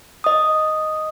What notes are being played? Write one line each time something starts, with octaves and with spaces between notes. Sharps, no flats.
D#5 D#6